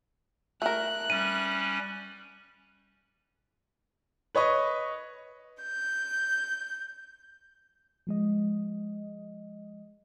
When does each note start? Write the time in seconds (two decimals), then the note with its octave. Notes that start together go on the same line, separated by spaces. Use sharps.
0.62 A3 A#4 F#6
1.10 G3 C#4 D#7
4.35 B4 C#5 D#5 C#6
5.62 G6
8.07 F3 G#3 D#5